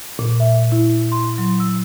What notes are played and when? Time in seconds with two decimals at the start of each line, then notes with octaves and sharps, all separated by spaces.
0.19 A#2
0.40 E5
0.72 E4
1.12 C6
1.38 F#3
1.60 E6